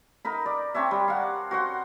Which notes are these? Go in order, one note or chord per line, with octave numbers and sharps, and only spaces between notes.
D#4 A#4 B5
D5
C4 D4 C#5 E5
G3
F5 F#5
F#4 C5 F#5